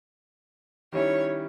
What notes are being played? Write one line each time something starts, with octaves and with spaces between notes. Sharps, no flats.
D#3 G3 C#4 E4 C#5